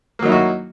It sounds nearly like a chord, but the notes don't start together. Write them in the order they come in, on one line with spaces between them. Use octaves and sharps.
A#3 F#3 D#4 E4 F#4